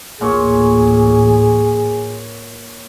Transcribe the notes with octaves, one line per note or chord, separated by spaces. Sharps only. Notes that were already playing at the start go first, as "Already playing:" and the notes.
A1 D2 A#2 G#4 C#5